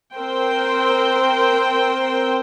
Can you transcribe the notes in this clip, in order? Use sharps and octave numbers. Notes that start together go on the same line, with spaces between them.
C4 A#4 C5 G5